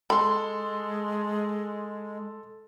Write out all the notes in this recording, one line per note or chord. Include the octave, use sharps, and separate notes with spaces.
G#3 A4 B5 C6